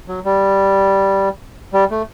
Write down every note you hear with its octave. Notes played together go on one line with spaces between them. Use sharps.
F#3
G3
G3
A3